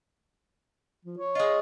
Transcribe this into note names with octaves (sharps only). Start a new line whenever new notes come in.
F3
C#5
G#3 F4 D#5